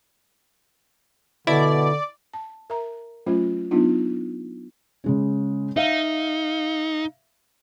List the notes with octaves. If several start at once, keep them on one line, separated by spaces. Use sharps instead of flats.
B2 D3 E4 D5
A5
A#4 E5 A#5
F#3 A3 C#4 F4 C5
F#3 B3 D4 D#4 F4
C#3 G#3 C#4
D#4 E5 F5